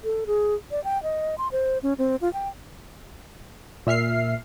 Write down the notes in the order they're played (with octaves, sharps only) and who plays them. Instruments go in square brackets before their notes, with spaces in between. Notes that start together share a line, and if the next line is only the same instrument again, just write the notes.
[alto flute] A4
G#4
D5
G5
D#5
C6
C5
C#4
C4
F4
G5
[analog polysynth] A#2 E5 F6 C7